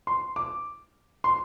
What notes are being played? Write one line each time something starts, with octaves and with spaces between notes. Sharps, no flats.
C6
D6
C6